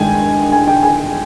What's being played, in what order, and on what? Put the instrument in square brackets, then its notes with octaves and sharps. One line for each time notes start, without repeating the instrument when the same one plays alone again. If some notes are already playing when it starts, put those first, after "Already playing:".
Already playing: [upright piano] G2 D#3 G#3 G5 G#5
G#5
G5
G#5